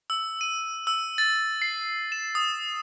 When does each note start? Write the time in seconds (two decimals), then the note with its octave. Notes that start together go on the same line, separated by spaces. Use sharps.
0.10 E6
0.41 D#7
0.87 E6
1.18 A6
1.62 C7
2.12 E7
2.35 D#6